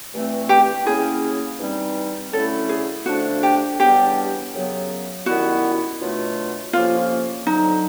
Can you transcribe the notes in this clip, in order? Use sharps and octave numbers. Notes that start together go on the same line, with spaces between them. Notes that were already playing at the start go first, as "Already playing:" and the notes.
G2 E3 A3 C4
G4
C#3 F#3 A#3 C#4 E4 G#4
G2 E3 G3 C4 D#4
D3 F#3 A3 C#4 E4 A4
G#4
D3 F3 A3 D4 F#4
G4
C#3 E3 G3 B3 D4 G4
F#2 C#3 F#3 B3
F#2 D#3 G3 B3 E4 F#4
B2 F#3 A3 D4 F4
F2 C3 F3 A#3 C#4 F4
F2 D3 F#3 D#4